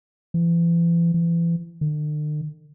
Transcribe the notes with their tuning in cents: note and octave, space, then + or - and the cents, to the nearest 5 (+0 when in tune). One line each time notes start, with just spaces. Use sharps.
E3 +40
E3 +35
D3 +45